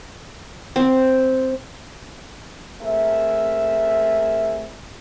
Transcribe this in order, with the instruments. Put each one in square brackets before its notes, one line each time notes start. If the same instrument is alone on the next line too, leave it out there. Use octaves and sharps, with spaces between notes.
[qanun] C4
[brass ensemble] A3 C4 G#4 A#4 E5